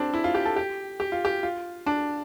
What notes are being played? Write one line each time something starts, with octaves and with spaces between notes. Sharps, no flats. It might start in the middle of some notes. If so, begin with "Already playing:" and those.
Already playing: C4 D4
E4
F4
G4
A4
G4
G4
F4
G4
F4
D4